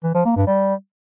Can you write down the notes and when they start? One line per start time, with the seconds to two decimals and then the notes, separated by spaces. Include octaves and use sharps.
0.04 E3
0.14 F3
0.25 A#3
0.36 G2
0.47 G3